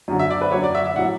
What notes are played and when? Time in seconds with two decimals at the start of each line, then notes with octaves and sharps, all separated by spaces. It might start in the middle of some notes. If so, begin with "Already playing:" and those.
0.08 F#2 D3 F#3
0.19 E5
0.30 D5
0.41 B4
0.52 F#2 D3 F#3 C#5
0.64 D5
0.75 E5
0.86 E5
0.96 A2 F#3 F#5